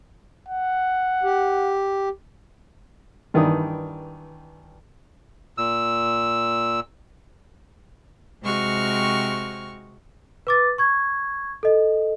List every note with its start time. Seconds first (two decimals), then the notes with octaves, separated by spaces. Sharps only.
0.49 F#5
1.24 G4
3.34 G2 D#3 E3 D5 D#6
5.58 A#2 E6
8.42 C3 G#3 C4 F#4 C#6 F6
10.47 B4 D6 A6
10.78 C#6 G#6
11.63 A4 D#5